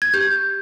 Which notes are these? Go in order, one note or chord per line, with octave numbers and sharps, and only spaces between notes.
G#6
G4 G6